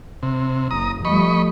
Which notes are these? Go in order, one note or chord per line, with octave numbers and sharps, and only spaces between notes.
C3
F#1 A#5 D#6
F3 G3 A3 D#5 B5 C#6